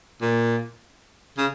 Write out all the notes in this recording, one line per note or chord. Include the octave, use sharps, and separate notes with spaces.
A#2
C#3